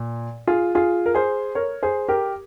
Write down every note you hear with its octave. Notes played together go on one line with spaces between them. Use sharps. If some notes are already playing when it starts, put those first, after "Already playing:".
Already playing: A#2
F4 G#4
F4 G#4
A#4
G#4 C5
A#4 C#5
G#4 C5
G4 A#4